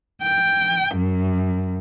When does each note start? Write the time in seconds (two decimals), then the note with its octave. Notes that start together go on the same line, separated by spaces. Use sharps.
0.21 G5
0.94 F#2